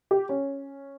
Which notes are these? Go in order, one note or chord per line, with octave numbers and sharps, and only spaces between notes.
G4
C#4